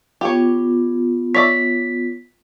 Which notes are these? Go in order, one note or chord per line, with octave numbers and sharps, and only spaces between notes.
B3 F4 G4 C#5
C#5 D5 E5 B6